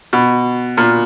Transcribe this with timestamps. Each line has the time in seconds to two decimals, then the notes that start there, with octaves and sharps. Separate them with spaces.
0.13 B2
0.77 A#2